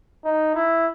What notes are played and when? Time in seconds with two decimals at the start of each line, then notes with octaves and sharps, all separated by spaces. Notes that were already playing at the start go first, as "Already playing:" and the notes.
0.25 D#4
0.55 E4